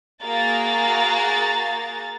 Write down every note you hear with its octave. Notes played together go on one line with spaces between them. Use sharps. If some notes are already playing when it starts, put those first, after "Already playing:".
A#3 F#4 G#4 A#5 A6